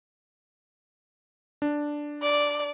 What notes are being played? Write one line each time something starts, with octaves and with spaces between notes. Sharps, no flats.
D4
D5